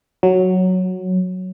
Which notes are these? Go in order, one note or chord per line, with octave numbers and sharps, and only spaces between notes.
F#3